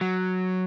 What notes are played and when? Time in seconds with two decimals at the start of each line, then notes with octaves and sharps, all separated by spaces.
0.01 F#3